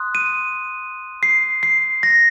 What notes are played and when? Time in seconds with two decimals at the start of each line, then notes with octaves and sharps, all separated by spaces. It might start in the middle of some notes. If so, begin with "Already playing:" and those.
Already playing: C6 D#6 F#6
0.15 D#7
1.23 C7
1.63 C7
2.03 A#6